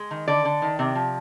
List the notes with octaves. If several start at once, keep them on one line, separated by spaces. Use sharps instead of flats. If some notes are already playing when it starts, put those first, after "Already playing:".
Already playing: G#3
D#3
D3 D5
D3
D#3
C3
F3